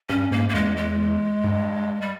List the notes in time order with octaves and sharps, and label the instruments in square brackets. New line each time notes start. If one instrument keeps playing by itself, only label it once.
[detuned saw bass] G2 [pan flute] C#4
[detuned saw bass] G#2 [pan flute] A#3
[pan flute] A#3
[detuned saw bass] E2 [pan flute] G#3
[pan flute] G#3
[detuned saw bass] G2
[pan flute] G3